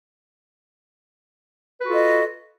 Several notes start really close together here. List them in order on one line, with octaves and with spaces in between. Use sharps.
B4 F#4 A4 F4 D#5